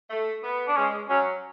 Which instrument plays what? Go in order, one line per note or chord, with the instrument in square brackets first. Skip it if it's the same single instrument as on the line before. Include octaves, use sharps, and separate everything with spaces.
[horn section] A3
B3
[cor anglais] D4
[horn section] G#3 [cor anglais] C#4
[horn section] F#3 [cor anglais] C#4